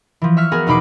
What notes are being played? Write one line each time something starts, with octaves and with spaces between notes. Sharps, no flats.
E3 F3
E5 C#6 F6 B6
B3 F#4 G#4 A#4
E2 B2 D#4 B5 D6 C7